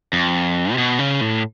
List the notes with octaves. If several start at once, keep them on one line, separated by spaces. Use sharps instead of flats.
F2
C3
B2
C#3
A2